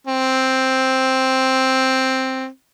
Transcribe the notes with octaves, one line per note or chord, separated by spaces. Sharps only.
C4